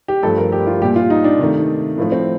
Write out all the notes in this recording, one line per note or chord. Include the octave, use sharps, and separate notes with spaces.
G4
G2 F3 A3 A4
A#4
G4
F4
A#2 G3 G4
F4
D#4
D4
C3 D#3 A3
A2 F3 A3
C4